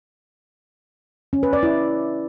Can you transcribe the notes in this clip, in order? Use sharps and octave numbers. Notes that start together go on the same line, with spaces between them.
C#4
B4
D5
E4